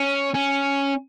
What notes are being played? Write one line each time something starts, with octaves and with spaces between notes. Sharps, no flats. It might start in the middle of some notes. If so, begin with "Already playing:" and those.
Already playing: C#4
C#4